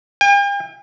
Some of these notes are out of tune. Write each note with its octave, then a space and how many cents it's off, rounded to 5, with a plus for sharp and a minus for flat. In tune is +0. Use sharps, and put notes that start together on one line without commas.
G5 +45